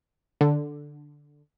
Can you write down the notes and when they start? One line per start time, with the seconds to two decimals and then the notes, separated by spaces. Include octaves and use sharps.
0.41 D3